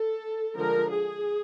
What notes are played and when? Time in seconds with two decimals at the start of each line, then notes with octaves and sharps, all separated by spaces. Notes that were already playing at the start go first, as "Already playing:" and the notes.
Already playing: A4
0.54 D3 F3 G#3 A#4
0.89 G#4